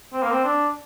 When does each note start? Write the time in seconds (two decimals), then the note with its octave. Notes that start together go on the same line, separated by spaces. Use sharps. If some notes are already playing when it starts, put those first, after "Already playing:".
0.13 C4
0.22 A#3
0.31 C4
0.44 D4